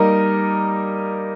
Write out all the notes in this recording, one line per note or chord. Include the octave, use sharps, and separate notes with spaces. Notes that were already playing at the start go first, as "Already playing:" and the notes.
Already playing: G3 A#3 D#4 A#4 D#5